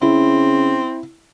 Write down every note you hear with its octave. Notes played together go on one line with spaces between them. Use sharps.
C#3 C4 E4